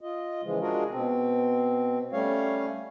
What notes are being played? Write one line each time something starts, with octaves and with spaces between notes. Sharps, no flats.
F4 D#5
C#3 E3 F3 G#3
G#3 D4 F4 F#4 G#4 A#4
B2 C4
G3 A3 C#4 C#5 F5